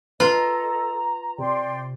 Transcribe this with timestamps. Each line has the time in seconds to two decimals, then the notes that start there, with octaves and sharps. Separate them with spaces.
0.20 F4 A4 B4 D#5 A#5
1.38 C3 D5 G5 C6